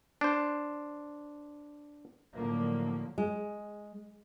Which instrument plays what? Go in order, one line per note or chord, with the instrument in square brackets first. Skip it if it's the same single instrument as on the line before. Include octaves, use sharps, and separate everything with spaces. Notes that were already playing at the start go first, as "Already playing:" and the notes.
[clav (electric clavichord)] D4 C5
[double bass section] A2 D3 F3 F#3 A#3
[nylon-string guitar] G#3